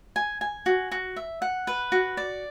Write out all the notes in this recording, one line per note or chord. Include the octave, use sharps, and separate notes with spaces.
G#5
G#5
F#4
F#4
E5
F#5
B4
F#4
D5